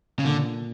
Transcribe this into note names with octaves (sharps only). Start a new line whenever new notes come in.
C#3
A#2 D3